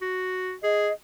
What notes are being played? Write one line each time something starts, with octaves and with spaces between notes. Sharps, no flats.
F#4
G#4 D#5